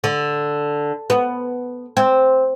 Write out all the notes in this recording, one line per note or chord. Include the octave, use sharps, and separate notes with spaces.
D3
B3
C4